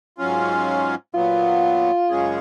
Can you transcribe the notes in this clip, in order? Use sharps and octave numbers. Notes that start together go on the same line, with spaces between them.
G#2 F#3 C#4 F4
A#2 F#3 B3 F4
F#2 C#3 G#3 C#4 G#4